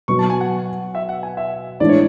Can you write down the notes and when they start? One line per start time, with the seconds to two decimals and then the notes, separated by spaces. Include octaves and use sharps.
0.08 B2 F#3 B3 F#4 C#6
0.19 A5
0.30 G#5
0.41 F#5
0.95 E5
1.09 F#5
1.23 G#5
1.37 E5
1.80 A2 E3 G#3 D4 D5
1.89 C#5